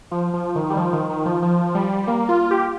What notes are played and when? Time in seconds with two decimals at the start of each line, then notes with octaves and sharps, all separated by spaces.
0.11 F3
0.34 F3
0.56 D#3
0.70 G3
0.77 F3
0.93 D#3
1.10 D#3
1.26 F3
1.42 F3
1.75 G3
2.07 A#3
2.29 F4
2.51 G4